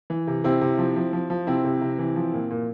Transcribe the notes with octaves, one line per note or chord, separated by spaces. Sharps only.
E3
C3
C3 C4 E4
C3
F3
F3
F3
F3
C3 C4 E4
C3
C3
E3
F3
A#2
A#2